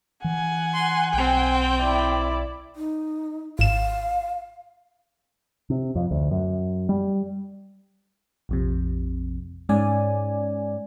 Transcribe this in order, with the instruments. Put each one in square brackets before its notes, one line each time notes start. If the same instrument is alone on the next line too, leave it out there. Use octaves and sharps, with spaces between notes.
[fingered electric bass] E3 [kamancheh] F#5 G#5
[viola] C6
[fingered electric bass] B1 [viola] C4 G5
[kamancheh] E4 D5
[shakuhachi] D#4
[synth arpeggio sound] G#1 E7 [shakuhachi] F5
[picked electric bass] C3
F2
D2
F#2
G3
[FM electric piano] A#1 F2 C3
G#2 G#3 C#4 D5 G#5